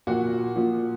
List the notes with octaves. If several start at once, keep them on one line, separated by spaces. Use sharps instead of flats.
A#2 F3 F#4
A#2 F3